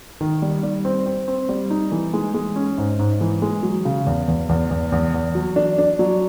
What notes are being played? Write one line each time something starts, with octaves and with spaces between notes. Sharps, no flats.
D#3
G3
G3
C4
C4
C4
G3
D#4
E3
G#3
G#3
C#4
G#2
G#2
E3
G#3
F#3
C#3
E2
E2
E2
E2
E2
E2
F#3
D4
D4
F#3